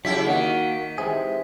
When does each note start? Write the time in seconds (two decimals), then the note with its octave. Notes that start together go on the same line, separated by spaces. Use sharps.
0.05 C#3 F#3 E4 G4 B6
0.26 D#3 A#3 F#4
0.98 C3 E3 G#3 G#4